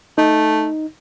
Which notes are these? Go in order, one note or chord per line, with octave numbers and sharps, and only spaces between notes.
A3 D#4